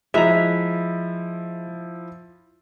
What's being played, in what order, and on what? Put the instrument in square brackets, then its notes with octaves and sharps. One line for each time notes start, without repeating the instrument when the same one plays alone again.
[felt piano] F3 E4 [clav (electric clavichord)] G#3 A#5 [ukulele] E5